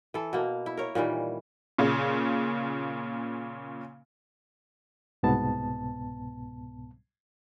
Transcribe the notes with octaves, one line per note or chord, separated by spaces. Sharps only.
E3 A4
B2 A#3
E4
A#4 C#5
A#2 D#3 E3 G3
A#2 C#3
C2 G#2 B2 B3 A5